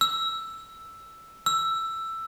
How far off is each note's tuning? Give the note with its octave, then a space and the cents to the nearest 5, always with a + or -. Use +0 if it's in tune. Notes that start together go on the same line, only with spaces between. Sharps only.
E6 +5
E6 +10